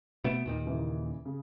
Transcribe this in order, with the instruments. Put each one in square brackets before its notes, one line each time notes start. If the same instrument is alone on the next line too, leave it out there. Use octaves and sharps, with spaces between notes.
[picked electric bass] B2 A3 B3 [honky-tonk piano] D7 E7
[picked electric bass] D#2 A#2 D#3
[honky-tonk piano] C#3 E3
C#3